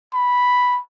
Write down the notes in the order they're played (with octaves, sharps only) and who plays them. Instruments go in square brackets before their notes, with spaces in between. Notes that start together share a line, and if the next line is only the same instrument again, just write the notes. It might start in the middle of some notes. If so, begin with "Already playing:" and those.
[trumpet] B5